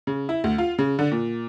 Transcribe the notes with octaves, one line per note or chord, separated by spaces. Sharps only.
C#3
E4
D2
F4
C#3
D3
A#2